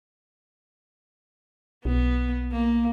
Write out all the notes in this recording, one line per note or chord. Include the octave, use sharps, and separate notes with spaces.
B1 B3
A#3